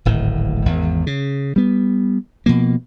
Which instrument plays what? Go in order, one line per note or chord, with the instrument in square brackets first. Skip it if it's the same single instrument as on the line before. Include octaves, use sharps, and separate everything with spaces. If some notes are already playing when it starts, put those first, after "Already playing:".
[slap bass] D1 G#1 A2
G#1 E2
C#3
G3 B3
B2 F3 A#3